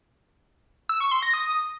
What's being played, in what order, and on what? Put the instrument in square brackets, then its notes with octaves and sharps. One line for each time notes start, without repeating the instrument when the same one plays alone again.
[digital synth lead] E6
C#6
C6
A#6
D#6